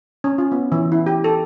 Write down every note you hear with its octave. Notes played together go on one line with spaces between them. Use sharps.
C#4
F4
B3
E3
E4
G4
A4